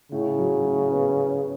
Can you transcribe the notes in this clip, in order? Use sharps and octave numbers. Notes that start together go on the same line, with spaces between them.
A2 C#3
F#3
A2
B3